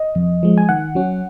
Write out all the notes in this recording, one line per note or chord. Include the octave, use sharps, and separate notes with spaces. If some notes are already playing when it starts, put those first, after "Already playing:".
Already playing: D#5
F2
F3 G#3
G#5
D#3 F#5
F#3 C#4